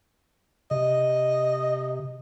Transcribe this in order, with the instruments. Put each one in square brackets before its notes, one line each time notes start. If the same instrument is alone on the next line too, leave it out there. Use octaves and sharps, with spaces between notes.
[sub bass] C3 [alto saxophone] D#5